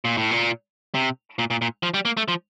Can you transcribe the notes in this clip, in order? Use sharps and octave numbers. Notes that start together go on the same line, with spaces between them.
A#2
A2
A#2
C3
A#2
A#2
A#2
F3
G3
A#3
A3
F3